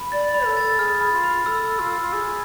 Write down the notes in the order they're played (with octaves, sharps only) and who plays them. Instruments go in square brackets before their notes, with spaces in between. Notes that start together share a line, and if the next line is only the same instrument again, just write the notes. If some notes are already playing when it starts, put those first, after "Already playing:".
Already playing: [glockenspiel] B5
[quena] D5 [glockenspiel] A6
[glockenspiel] B5
[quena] A4
[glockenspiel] A6
[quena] G#4 [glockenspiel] F6
[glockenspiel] B5
[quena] F4
[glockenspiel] B5
[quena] A4 [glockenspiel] E6
[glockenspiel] E6
[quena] F4
[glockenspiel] E6
[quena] F4
[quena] G#4 [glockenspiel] E6